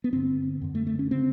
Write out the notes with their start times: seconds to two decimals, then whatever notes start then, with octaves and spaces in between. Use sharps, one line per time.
0.04 B3
0.12 G2 D3 C4
0.62 F#2 D3
0.75 A3
0.87 A3
0.99 C#4
1.11 C#3 C4